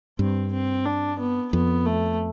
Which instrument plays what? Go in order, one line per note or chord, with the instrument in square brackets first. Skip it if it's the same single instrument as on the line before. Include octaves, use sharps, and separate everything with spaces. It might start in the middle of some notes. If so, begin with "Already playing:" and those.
[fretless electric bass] G2 [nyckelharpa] C4
[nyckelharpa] C4
D4
B3
[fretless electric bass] F2 [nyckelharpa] B3
[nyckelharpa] A3